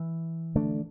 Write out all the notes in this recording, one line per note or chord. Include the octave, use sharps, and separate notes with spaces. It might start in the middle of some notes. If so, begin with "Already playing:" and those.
Already playing: E3
D3 A3 D4